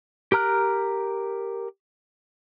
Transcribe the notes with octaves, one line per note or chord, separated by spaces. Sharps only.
G4 A#4 A#5 F6 F#6